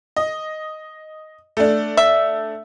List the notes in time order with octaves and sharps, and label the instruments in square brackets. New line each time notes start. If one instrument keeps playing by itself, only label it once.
[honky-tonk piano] D#5
A3 D4
[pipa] E5